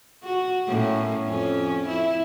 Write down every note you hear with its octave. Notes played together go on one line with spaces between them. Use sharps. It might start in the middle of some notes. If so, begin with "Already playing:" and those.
F#4
A2 A#3 C#4
F2 C#4
E4